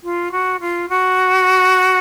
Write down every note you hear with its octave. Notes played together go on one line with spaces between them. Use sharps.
F4
F#4
F4
F#4